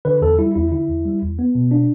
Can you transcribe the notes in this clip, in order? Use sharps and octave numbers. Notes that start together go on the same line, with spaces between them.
D3 B4
E2 A4
G3 E4
E2 E4
D3 E4
E2
G3
E2
B3
B2
D4